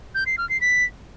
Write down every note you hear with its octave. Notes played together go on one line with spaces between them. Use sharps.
G6
C7
F6
C7
B6